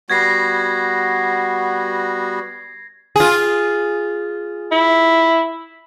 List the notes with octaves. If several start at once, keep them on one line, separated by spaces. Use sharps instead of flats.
G3 B3 F#4 G#6 A#6 C7
F4 G#4
E4